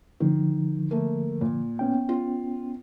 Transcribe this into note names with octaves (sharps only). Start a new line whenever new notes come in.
D3 D#3 F3
A3 A#3
A#2
B3 C#4 G5
F4